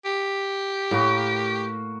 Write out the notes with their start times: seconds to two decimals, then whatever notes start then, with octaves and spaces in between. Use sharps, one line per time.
0.05 G4
0.91 A2 A#3 F#4